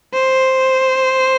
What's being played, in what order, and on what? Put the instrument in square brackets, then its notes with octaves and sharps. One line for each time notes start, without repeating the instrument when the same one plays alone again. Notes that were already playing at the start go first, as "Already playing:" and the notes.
[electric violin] C5